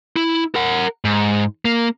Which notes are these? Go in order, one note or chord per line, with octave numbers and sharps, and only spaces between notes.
E4
A#4 F#5
G#2
A#3